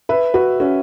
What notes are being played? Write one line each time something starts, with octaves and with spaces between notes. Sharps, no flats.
B4 E5
F#4 B4
C#4 F#4